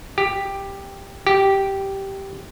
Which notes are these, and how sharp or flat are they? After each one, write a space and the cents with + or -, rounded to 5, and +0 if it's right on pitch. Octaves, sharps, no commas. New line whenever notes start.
G4 +10
G4 -5